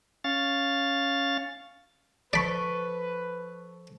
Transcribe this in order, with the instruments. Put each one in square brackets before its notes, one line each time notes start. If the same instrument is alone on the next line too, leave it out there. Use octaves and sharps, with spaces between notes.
[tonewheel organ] C#4 F5 A6
[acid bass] F3 [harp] A4 C#6 [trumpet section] B4 [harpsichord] D5 B5